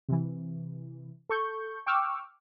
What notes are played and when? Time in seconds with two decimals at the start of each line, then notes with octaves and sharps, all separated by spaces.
0.09 C3 E3
1.29 A4 C#6 G6
1.86 G5 C#6 D6 E6 F6